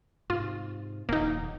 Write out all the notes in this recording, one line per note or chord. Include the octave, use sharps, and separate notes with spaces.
G#2 C3 F4
D#1 F2 A#3 D#4